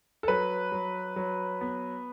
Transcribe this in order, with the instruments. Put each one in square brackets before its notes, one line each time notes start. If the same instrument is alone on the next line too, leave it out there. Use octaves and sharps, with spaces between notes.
[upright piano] A4
F#3 B4
F#3
F#3
B3